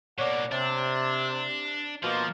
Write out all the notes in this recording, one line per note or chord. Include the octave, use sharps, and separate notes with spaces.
B2 A#3 C#5 D5 F#5
C3 D4
B2 F3 A#3 F4